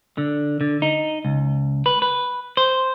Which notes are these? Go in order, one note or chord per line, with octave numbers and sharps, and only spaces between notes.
D3
D3
D#4
C#2
B4
B4
C5